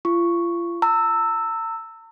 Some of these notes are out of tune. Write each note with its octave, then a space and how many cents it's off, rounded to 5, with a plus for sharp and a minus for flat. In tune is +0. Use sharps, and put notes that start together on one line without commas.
F4 -35 C#6 +0
A#5 -45 E6 +0